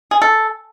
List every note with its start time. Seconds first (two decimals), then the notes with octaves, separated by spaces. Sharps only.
0.11 G#4
0.22 A4